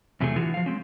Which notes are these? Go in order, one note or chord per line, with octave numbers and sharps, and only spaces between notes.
E2 C3 F#3 A3 G#4
D3 E3 F4 F#4 G#4
F3 F5
G#3 C4 C#4